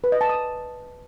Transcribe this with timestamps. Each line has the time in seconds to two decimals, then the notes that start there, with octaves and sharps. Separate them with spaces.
0.04 B4
0.12 D#5
0.21 A5
0.29 D#6